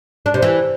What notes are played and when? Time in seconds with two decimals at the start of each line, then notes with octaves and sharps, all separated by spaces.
0.26 D4
0.34 C3
0.42 E3